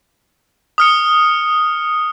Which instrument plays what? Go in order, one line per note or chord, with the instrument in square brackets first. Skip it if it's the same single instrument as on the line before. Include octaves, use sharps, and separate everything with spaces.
[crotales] D#6 F6 C#7